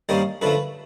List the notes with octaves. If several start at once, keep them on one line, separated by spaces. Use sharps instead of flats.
G2 D#3 G3 A#3 C#4 C5
F#2 D3 F3 A3 B4